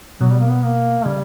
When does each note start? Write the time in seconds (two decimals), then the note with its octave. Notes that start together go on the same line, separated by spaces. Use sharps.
0.20 B2 F#3
0.30 G3
0.39 A#3
0.49 B3
0.63 A#3
1.06 C#3 G3